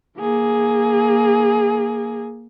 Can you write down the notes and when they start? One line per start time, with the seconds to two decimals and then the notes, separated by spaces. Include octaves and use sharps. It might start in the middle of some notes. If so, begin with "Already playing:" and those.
0.18 A#3 G#4